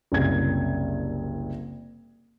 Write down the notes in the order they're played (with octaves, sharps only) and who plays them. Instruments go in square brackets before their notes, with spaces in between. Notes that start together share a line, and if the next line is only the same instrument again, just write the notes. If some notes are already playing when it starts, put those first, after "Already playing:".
[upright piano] F#1 C2 G#6